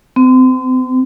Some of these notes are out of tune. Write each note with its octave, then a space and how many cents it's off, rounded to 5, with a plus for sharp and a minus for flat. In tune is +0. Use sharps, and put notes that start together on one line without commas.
C4 -35